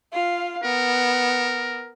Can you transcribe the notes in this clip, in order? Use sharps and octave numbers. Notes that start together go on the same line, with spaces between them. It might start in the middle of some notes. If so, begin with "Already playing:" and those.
F4 F5
B3 A#4